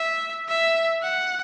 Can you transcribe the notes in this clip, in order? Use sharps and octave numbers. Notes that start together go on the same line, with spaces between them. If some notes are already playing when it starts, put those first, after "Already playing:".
Already playing: E5
E5
F#5